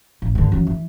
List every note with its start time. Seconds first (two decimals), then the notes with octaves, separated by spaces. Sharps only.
0.22 A1
0.35 G2 D3
0.52 F#2 E3
0.67 E3